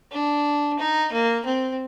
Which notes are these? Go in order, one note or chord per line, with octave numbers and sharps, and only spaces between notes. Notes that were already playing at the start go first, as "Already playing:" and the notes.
D4
D#4
A#3
C4